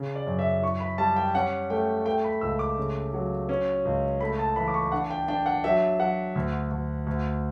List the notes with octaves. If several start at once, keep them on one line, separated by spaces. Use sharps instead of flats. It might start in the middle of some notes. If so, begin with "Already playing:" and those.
Already playing: C#3
D5
F#2
E5
E4 C#6
B5
G3 A5
G5
C#4 F#5
A3 G5
A3 G5
B5
C#2 E6
D6
C#3
F#3
C#4
C#2
A3 B5
A5
E3 B5
D6
C#6
D4 F#5
G5
D4 G5
F#5
F#3 E5
F#3 F#5
D2
D2
D2